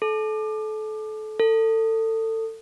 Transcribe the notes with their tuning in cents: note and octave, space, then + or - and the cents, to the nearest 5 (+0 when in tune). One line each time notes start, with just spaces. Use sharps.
A4 -30
A4 +25